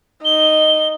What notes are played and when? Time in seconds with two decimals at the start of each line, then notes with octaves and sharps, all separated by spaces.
0.25 D#4 G7